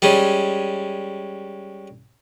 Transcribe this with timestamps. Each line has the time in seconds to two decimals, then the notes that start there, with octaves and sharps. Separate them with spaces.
0.02 G3 G#3 C#4